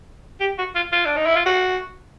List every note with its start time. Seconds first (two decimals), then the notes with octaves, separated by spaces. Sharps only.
0.40 G4
0.58 F#4
0.75 F4
0.92 F4
1.06 D4
1.16 D#4
1.26 E4
1.36 F4
1.46 F#4